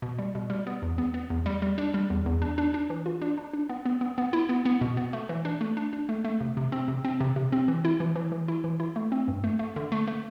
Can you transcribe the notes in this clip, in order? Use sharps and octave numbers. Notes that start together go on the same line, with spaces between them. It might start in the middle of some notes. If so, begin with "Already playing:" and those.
B2
G3
B2
G3
B3
E2
B3
B3
E2
G3
G3
D4
G3
E2
E2
D4
D4
D4
E3
F4
D4
D4
D4
B3
B3
B3
B3
E4
B3
B3
B2
B3
A3
E3
D4
A3
D4
D4
A3
A3
C3
C3
C4
C3
C4
C3
C3
C4
E3
E4
E3
E3
E3
E4
E3
E4
A3
C4
G2
A3
A3
D3
A3
A3